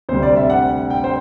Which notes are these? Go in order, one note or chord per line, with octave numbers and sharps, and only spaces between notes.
D2 C3 G3 C5
D5
E5
F#5
G5
C5